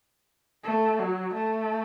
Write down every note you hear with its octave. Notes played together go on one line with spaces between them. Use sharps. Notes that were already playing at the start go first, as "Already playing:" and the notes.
A3
F#3
A3